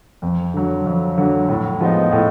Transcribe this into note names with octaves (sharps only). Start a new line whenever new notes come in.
F2
D3 F#3
F2
D3 F#3
A2
F3 G#3 B3 D#4
A2